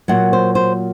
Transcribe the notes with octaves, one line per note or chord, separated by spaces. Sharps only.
A#2 F#3 A#3 F#5
C5
C5